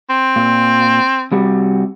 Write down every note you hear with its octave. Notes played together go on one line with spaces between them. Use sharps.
C4
A#2
C3 G3 F#4